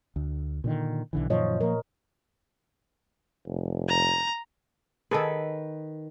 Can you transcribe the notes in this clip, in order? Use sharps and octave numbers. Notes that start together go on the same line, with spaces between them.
D2
A#2 D3 D#3
B1 D3 E3
F#2 A#2 D#3 F3 C#5 D#5
F3 A#3 A#4
F1
A#5
D#3 G#4 A4 B4